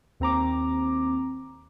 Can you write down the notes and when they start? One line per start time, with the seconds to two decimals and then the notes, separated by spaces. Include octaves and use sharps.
0.20 D#2 C4 A#5 D6